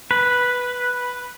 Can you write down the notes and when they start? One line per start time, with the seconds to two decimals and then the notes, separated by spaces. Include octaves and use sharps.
0.11 B4